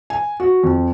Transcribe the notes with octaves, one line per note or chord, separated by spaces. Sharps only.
G#5
F#4
F2